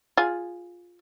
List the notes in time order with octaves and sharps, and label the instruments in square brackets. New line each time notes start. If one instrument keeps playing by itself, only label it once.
[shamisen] F4 G#4